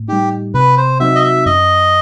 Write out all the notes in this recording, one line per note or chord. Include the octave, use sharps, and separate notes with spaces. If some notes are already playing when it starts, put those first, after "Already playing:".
Already playing: A2
G3 D#4 G4
C3 B4
C5
F#3 C4 D#4 F#4 E5
D#5
E5
F#2 D#5